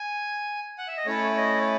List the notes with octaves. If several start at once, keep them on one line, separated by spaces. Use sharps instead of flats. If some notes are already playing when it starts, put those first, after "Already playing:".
Already playing: G#5
F#5
E5
D#5
A3 C#4 E4 A4 C#5
C#5
D#5
C#5